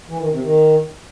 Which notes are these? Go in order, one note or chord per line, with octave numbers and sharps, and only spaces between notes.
E3
D#3
C3
D#3